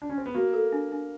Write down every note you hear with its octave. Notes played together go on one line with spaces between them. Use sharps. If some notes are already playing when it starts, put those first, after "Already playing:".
D4
C#4
C4
B3
A#3 F#4
A4
D4
D4